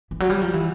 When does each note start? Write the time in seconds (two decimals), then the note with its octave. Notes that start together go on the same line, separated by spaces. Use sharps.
0.11 E3
0.20 F#3
0.30 G3
0.41 F3
0.53 E3